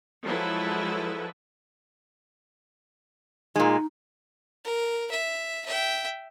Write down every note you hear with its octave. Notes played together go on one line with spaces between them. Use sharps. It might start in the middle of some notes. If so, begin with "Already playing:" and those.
F3 F#3 G#3 E4 A4 B4
A#2 G#3 D#4
A#4
E5
E5 G5